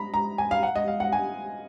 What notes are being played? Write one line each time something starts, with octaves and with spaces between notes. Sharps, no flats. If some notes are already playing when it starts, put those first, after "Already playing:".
Already playing: A#5 B5
A#5
G#5
F5
F#5
D#5
F5
F#5
G#5